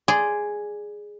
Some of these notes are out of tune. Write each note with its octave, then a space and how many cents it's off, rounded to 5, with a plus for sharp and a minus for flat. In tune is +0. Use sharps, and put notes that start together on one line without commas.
G#4 +0 D5 +0 C6 -15